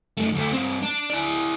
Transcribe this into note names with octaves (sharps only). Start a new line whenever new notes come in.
F#2 A3
D2 A3
G2 C4
D4
E4 D5